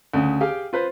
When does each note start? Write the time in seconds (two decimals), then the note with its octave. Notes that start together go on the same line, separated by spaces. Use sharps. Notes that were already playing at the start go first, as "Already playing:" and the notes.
0.14 D2 C#3
0.41 G4 G#4 F5 G5
0.73 F4 B4 C5